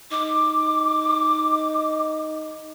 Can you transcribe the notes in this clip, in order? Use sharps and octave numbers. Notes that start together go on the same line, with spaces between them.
D#4 D6